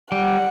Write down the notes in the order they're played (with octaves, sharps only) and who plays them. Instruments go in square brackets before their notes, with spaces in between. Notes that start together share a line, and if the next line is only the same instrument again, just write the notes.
[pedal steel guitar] G3 [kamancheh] F#5